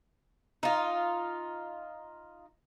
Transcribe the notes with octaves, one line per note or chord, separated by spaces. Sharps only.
D#4 F4